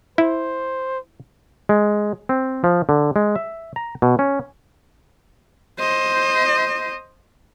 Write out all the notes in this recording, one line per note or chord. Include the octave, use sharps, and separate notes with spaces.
E4 C5
G#3
C4
F3
D3
G#3
E5
A#5
B2
C#4
C5 D#5